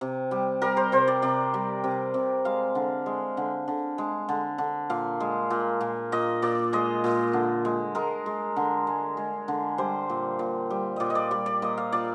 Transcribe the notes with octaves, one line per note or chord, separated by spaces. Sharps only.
C3
G3
G3 A#4
C5
C3 C5
D5
C3 D5
G3
C3
C3
G#3 F5
D3
G#3
D3
D3
G#3
D3
D3
A#2 F5
G#3
A#2
A#2
A#2 D#5
A#2 D5
G#3 D#5
A#2
D3
G#3
G#3 A#4
G#3
D3
G#3
G#3
D3
G3 C5
A#2
A#2
G3
A#2 D5 D#5
D#5
D5
G3 D5
D5
A#2 D#5
F5
A#2 D5